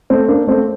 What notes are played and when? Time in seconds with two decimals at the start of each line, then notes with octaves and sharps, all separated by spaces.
0.10 A3 C4
0.28 A#3 D4
0.47 A3 C4